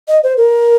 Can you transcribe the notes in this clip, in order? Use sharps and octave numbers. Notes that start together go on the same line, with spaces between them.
D#5
C5
A#4